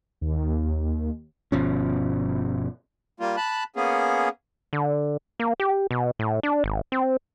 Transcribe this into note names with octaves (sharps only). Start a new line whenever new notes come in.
D#2
G1 B2 F3 C#4
G3 A#3 F4
A5 B5 F#6
A#3 B3 C#4 G#4
D3
A#3
G4
B2
A2
D4
G#1
C4